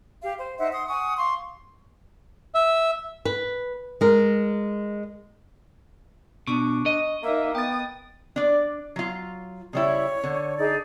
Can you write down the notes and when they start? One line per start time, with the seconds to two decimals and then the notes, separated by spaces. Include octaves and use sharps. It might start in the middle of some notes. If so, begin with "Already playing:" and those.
0.22 G4 F5
0.40 C5
0.58 D#4 C5 E5 F#5
0.73 F#5 C6 D#6
0.88 F#5 G#5 C#6 D#6
1.18 F5 C6 C#6
2.54 E5
3.25 B4
4.01 G#3 A#4
6.47 B2 D4 C#6
6.86 D#5
7.23 A#3 D#4 E5
7.55 B3 G5 D#6 A6
8.36 D4 D5
8.96 F#3 F4
9.73 C#3 G3 E4 C#5
10.23 D3
10.57 D#4 G#4 D5